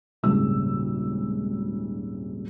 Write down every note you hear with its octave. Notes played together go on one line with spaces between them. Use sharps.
D#1 G#1 C#3 E6